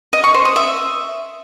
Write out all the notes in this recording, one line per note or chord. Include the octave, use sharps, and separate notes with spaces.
D#5
C#6
C5
D#6
E5